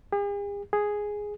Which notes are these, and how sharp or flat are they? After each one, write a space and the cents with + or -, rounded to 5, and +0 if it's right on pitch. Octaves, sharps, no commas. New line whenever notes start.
G#4 -45
G#4 +0